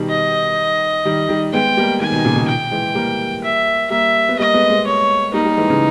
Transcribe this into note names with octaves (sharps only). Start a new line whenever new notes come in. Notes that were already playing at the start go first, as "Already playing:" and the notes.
Already playing: B2 D#3 G3
D#5
D#3 G3
D#3 G3
G#3 B3 G5
G3 A#3
D#3 G3 G#5
B2 D#3
A#2 C#3
B2 D#3
G5
E3 G#3
G3 A#3
E5
G3 A#3 E5
B3
G3 A#3 D#5
G#3 B3
G#3 B3
C#5
G3 A#3 D#4
G3 A#3
E3 G#3
C#3 E3